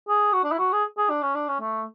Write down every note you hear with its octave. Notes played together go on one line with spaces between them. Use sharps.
G#4
F#4
D4
E4
F#4
G#4
G#4
D4
C#4
D4
C#4
A3